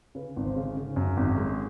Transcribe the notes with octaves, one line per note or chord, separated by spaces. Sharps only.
C#3 B4
G#1
C5
C#3
C#3
F#2
G#1
G#3